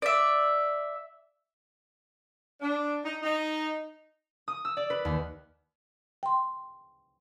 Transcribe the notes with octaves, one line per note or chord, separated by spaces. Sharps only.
D5 E5
D4
D#4
D#4
D#6
E6
D5
B4
D#2
G5 C6